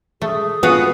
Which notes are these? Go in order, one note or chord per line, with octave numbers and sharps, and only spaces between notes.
A3 G#4
B3 F4 F#4 F5 G#5